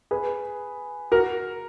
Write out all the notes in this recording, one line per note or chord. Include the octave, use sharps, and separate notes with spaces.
G#4 B4
F#4 A#4